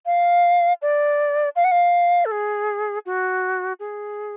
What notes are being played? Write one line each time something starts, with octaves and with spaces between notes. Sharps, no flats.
F5
D5
F5
F#5
F5
A4
G#4
F#4
G#4